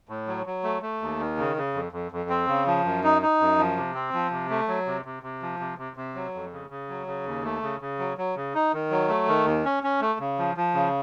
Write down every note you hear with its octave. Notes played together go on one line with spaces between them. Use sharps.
A2
F#3
F#3
A3
A3
D#2
D#3
C#3
C#3
F2
F2
F2
C4
C#3
F3
F#2
D#4
D#4
F#2
F3
C3
C4
F3
C3
A3
F#3
C3
C3
C3
F3
C3
C3
C3
F#3
F2
C#3
C#3
F#3
C#3
D#2
A3
C#3
C#3
F#3
F#3
C#3
D#4
D#3
F#3
A3
D#3
D#2
C#4
C#4
A3
C#3
F3
F3
C#3